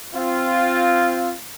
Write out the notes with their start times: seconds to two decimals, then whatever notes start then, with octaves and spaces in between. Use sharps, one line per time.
0.14 C4 F4